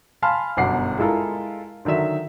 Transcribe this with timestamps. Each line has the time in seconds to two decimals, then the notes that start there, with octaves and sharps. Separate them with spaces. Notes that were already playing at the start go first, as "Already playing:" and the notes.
0.22 F5 G#5 A5 B5 C6 F6
0.57 G1 F#2 B2 F#5 D6 C7
0.99 G#3 E4 F4 A4 A#4
1.85 D3 D#3 F#3 E5 E7